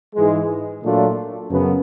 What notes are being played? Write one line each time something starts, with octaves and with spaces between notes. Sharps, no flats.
G#2 E3 G#3
A#2 F#3 A3 D4 F4
F#2 C#3 F#3 B3